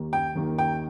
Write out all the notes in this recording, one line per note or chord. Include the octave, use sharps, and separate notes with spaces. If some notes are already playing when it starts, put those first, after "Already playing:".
Already playing: D#2 D#3 A#3
G5
D#2 D#3 A#3
G5